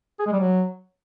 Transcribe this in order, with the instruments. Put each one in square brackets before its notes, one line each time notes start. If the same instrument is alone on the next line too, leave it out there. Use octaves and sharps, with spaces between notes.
[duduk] G#4
G#3
G3
F#3